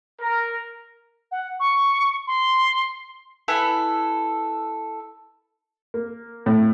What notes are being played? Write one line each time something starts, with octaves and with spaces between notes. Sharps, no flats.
A#4
F#5
C#6
C6
E4 A4 B4 G#5
A#3
A2